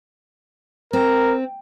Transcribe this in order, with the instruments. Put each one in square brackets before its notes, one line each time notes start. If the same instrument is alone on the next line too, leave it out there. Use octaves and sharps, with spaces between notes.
[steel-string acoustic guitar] C4 [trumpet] A#4